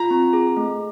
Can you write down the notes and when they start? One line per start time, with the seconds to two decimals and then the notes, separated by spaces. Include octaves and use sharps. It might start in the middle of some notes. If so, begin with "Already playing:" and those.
Already playing: F4 A#5
0.11 C4
0.33 G#4
0.57 A3